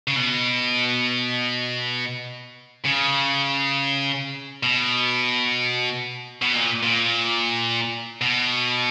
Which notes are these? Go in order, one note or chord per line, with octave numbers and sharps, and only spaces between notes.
C#3
B2
C#3
B2
B2
A#2
A#2
B2